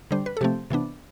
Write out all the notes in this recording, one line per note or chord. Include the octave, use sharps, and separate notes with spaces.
D3 G3 D4 C5
B4
A4
C3 F3 A3 C4 G4
C3 E3 B3 D4